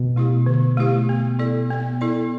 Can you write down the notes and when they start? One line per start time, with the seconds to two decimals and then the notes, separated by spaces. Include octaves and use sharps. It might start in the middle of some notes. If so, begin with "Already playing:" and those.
Already playing: B2
0.16 A3 E4 G4
0.46 D3
0.77 A3 E4 G4
1.09 B3
1.39 E4 A4 D5
1.71 B3
2.01 E4 A4 D5